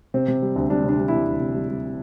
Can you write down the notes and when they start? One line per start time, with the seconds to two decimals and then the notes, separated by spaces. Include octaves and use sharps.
0.14 C3 C4
0.28 C3
0.42 G3
0.56 D2
0.70 G3 D4
0.84 C3 D4
0.98 G3
1.08 C3 E4
1.27 D2
1.40 C3
1.55 G3
1.69 G3